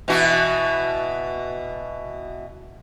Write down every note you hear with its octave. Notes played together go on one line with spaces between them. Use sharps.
B2 E3 F#4